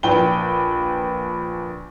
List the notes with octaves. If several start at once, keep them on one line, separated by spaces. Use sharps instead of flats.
A#1 B4 G5 G7